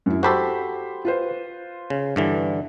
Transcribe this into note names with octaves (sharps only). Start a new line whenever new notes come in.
F#2 E4
F#4 G4 A4 C5 B5
F4 B4 C5
C#3
G2 D3 E3